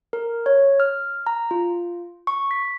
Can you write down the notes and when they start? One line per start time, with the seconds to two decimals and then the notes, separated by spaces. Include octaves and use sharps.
0.13 A#4
0.46 C#5
0.80 F6
1.27 A#5
1.51 F4
2.27 C#6
2.51 B6